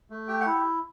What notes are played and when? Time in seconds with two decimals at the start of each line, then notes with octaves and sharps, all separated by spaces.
0.10 A3
0.28 G4 G5
0.41 F#5
0.46 E4